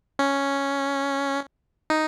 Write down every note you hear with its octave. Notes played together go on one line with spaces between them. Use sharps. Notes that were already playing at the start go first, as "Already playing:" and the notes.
C#4
D#4